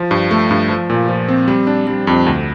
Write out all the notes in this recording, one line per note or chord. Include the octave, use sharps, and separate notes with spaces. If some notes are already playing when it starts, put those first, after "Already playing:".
Already playing: F3
G2
A3
G2
F3
A#2
F3
C4
G3
D4
G3
F2
D2